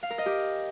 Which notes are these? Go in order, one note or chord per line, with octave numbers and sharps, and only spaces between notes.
F5
A#4
D#5
G4